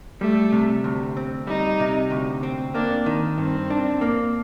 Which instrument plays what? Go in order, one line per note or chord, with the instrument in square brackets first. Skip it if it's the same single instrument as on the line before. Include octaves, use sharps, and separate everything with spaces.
[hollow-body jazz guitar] G3 [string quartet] A3
[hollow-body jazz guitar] C3
D2
C4
[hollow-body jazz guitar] G3 [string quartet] D#4
[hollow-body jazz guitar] C3
D2
C4
[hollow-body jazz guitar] A#3 [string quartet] D4
[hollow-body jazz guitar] D#3
[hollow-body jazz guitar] G2 [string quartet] C4
[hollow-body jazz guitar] D4
A#3